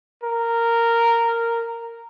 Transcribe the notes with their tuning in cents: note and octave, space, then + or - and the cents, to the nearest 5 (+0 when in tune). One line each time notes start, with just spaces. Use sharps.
A#4 -10